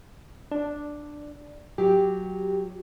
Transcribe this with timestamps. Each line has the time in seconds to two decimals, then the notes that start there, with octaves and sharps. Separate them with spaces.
0.52 D4
1.78 F#3 G4